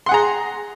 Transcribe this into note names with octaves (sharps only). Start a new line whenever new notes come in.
G#4 F#5 A#5 C6